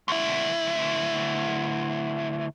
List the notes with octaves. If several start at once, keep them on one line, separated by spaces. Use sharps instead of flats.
D2 E4